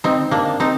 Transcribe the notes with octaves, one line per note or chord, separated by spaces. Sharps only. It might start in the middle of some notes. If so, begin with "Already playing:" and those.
C4 D#4
A#3 D4
C4 D#4